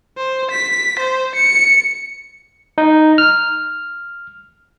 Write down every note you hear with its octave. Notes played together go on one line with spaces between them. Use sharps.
C5
B6
C5
C#7
D#4
F6